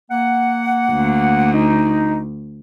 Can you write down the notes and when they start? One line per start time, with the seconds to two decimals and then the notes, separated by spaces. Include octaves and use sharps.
0.11 A#3 F#5
0.92 D2
1.53 D#4